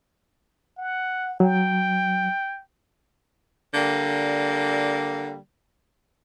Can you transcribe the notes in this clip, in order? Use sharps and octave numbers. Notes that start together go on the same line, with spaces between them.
F#5
F#3 G5
D3 G3 A#3